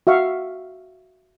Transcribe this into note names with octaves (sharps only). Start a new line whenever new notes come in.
F#4 E5 F5 C#6